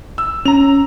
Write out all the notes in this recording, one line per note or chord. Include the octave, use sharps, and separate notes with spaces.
E6
C#4 A#5 F7